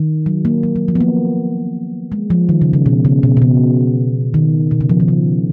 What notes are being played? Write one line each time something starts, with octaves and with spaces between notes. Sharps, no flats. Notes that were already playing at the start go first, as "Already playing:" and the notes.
Already playing: D#3
F#3
A#3
F#3
F#3
F3
B3
A#3
G#3
F3
D#3
C#3
C#3
B2
C#3
B2
B2
C#3
D#3
B2
C#3
F3
D#3
C#3